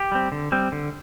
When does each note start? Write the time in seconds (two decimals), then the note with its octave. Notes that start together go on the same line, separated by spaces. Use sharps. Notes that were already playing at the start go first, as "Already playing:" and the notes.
Already playing: G4
0.12 G3 C4
0.32 D3
0.52 G3 C4
0.72 D3